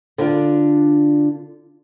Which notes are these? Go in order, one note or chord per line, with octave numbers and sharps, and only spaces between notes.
D3 D4 F4